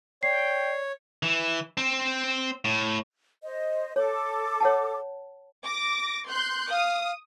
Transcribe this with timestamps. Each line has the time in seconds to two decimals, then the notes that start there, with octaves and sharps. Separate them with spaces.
0.23 C#5 D5 G5 C7
1.23 E3
1.77 C4
2.65 A2
3.43 C5 D#5
3.96 A4 C#5 D6
4.60 C#5 F#5 A5
5.64 D6 A#6
6.29 C6 F#6 G6
6.71 F5 D#6